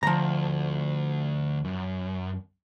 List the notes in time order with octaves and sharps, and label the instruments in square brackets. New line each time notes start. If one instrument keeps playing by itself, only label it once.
[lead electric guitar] D2 [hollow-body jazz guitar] F3 A#5
[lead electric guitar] F#2